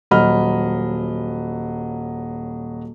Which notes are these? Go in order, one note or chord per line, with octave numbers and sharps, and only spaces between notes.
D#1 F#3 D#5 B5 F6